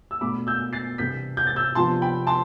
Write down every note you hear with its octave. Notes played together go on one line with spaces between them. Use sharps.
E6
B2 A3 D4 B5 D6
E6 G6
A6 C7
C3 E3 G3 D4 G6 B6
G6
A6
E6 G6
C3 F3 B3 D4 A5 C6
G5 B5
A5 C6